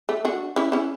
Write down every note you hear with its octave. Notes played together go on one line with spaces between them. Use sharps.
A3
D4 F#4
C#4 E4
C#4 E4